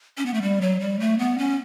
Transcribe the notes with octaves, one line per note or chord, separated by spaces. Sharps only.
C#4
B3
A3
G3
F#3
G3
A3
B3
C#4